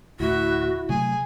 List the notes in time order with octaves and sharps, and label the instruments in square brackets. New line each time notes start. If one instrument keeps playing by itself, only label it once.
[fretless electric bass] D2 A2 [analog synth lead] E4 [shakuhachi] F#4 [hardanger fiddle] E5
[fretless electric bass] C3 F#3 A3 [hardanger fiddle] G#4